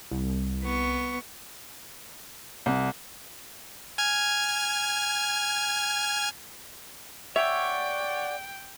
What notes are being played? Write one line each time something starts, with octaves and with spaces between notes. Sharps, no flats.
C2
B3 C#6
C2
G#5 F6 G#6
C#5 D5 E5 F#5 G5